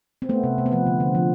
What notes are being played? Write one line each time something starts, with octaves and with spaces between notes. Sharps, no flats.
C4
A3 B3
C3
C3
B3
F3 C4
D3
D3
F3